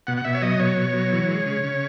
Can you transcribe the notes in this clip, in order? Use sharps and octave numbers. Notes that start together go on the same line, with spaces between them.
B2 F#5
F#5
B2 E5
C#5
F#3 D#5
B2 C#5
B2
F#3
E3
G#3
C#3
C#3